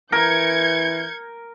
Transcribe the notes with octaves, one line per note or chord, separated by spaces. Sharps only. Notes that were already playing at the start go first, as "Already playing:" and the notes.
E3 A#4 G6 G#6 C#7